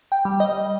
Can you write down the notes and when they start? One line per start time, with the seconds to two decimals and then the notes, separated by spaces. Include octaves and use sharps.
0.12 G5
0.25 G3
0.40 D#5